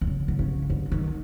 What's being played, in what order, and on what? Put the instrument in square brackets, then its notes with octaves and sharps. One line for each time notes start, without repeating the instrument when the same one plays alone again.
[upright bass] D3
C#3
D3
C#3
D3
D#3